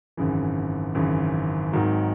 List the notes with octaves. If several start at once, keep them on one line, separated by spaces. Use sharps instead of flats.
G#1 F#2 C#3 E3
G#1 F#2 C#3 E3
G#1 G#2 D#3 F#3